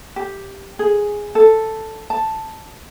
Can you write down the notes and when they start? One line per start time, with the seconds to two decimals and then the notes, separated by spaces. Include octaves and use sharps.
0.16 G4
0.79 G#4
1.35 A4
2.10 A5